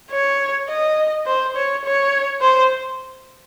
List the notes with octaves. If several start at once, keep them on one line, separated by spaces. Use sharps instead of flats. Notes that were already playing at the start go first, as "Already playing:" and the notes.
C#5
D#5
C5
C#5
C#5
C5